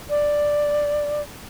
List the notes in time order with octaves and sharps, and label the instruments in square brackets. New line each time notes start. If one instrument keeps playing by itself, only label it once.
[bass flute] D5